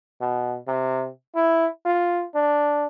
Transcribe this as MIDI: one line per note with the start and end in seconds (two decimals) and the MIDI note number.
0.21 0.58 47
0.68 1.08 48
1.35 1.66 64
1.85 2.24 65
2.35 2.87 62